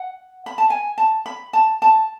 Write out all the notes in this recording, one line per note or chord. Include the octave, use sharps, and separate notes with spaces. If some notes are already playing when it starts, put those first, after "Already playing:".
Already playing: F#5
B5
A5
G#5
A5
B5
A5
A5